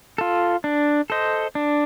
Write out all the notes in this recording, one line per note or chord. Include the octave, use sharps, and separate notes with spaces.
F4 A4
D4
A4 C5 D#5
D4